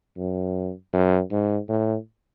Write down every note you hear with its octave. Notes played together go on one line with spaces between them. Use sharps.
F#2
F#2
G#2
A2